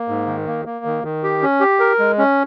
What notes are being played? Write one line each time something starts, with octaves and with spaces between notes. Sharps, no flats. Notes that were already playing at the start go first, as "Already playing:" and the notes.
Already playing: A#3
G#2
D#3
A#3
A#3
D#3
D#3
G4
C#4
G4
A#4
G#3
C#4